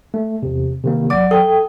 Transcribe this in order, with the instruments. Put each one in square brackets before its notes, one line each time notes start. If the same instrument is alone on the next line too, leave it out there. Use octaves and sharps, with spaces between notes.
[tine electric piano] A3
E2 C3
C3 D#3 A#3
[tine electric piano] G1 D6 [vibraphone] F#3 D5
[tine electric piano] A4 D#6 [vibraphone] G5